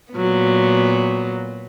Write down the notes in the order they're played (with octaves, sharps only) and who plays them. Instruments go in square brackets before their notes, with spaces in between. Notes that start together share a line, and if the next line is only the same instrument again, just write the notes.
[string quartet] A#2 F#3 B3